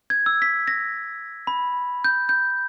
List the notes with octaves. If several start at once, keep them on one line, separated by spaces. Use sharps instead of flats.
G#6
E6
B6
A#6
B5
G6
G6